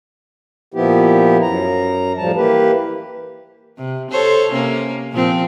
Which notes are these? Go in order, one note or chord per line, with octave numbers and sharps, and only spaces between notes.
A#2 F3 B3 E4 G4
F#2 A#5
A2 F3 G3 A5
E3 A#3 G4 B4
C3
A4 C5 C#5
C3 A#3 C#4
A#2 F3 C4